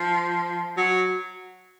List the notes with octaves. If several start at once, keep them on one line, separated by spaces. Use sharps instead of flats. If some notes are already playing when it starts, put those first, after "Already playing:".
Already playing: F3
F#3